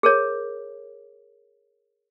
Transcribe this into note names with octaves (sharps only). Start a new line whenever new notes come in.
G#4 A#4 C#5